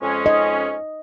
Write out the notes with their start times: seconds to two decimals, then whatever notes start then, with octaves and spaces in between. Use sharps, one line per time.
0.02 F2 G#3 C#4
0.26 D#5